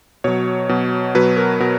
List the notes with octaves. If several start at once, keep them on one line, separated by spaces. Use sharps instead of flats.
B2 F#3 C#5
B2 F#3
B2 F#3 B4
A#4
B2 A#4